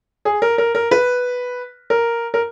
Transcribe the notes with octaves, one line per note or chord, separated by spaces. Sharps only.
G#4
A#4
A#4
A#4
B4
A#4
A#4